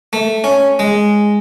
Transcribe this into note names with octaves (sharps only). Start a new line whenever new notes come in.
A3
C#4
G#3